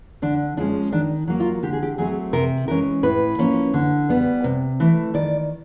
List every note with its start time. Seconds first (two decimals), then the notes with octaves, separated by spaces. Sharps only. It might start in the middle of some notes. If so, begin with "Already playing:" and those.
0.22 D3 D4
0.57 F3 G#3 C#4 D4
0.92 D#3 D4
1.27 F#3 A#3
1.40 F4
1.63 D3 G4
1.73 G#4
1.83 G4
1.98 F#3 A3 C4 G#4
2.33 C3 A#4
2.68 E3 G#3 C#4 A#4
3.03 A2 B4
3.38 F3 A#3 C#4
3.74 D3
4.09 G3 B3
4.44 C3
4.80 E3 A3
5.14 D#3 D5